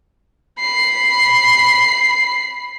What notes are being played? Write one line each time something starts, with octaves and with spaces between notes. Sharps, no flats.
B5 C7